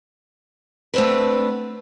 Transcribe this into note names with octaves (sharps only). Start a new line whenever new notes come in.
A3 B3 C4 D4 B4